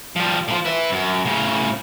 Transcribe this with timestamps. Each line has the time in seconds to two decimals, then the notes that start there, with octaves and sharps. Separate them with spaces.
0.16 F3 G3
0.48 A2 F3
0.65 B4 E5
0.92 F#2
1.25 A2 C#3